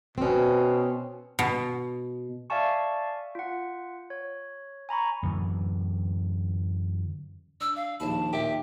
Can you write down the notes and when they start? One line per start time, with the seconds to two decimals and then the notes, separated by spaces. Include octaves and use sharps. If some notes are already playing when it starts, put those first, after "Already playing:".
0.18 B2 C4 C#4
1.39 B2
2.50 D5 E5 F5 G#5 A5 C#6
3.35 F4 F#5
4.10 C#5
4.89 G#5 A#5 B5 C#6
5.23 F#2 D3 E3
7.61 D4 E6
7.76 F5
8.00 A#1 D#2 A5 B5
8.33 A#2 G4 E5